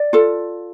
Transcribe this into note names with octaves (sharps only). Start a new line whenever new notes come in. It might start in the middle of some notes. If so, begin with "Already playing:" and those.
Already playing: D5
F4 A4